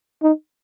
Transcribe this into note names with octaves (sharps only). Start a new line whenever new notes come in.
D#4